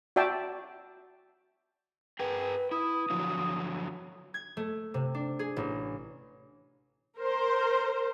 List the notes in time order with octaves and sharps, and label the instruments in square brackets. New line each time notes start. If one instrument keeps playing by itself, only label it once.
[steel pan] F#4 D5 E5 G5 A5
[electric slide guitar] G#4 A#4 G5 [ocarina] B4
[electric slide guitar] E4 [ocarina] D#6
[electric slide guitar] D3 F3 F#3
[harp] G#6
A3
C3
D4
G#4
A1
[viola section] A#4 C5